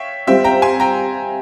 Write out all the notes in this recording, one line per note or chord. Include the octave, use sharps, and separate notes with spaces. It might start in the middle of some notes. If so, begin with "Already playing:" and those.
Already playing: C#5 E5 F5 G5
G3 C4 F4 E5 G5
G5 A#5
G#5 C6
G5 A#5